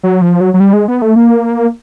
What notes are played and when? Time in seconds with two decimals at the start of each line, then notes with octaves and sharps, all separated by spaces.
0.03 F#3
0.21 F3
0.41 F#3
0.54 F#3
0.60 G3
0.73 G#3
0.88 B3
1.02 A3
1.16 A#3